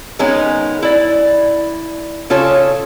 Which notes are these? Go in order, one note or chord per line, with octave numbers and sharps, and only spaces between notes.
D#3 G#3 B3 C#4
E4 D5
C#3 F4 A4 C#5